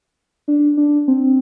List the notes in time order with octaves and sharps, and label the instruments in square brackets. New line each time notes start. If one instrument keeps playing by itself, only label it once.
[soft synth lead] D4
D4
C4